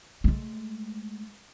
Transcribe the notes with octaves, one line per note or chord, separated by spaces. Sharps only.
G#3 A3